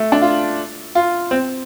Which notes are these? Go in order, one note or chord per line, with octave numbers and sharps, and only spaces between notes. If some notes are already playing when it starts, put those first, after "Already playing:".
Already playing: A3
D4
F4
F4
C4